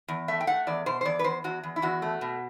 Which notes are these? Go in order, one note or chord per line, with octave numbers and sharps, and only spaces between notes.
E2
A3 E5
G5
A3 F#5
E2 D5
B2 C5
C5
E2 D5
B4
E2 C5
E2 F#4
E2
E4
E2 F#4
A3
B2